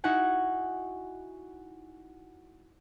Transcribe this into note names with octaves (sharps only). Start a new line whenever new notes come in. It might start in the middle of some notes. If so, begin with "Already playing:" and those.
D#4 E4 F#4 F#5 G#5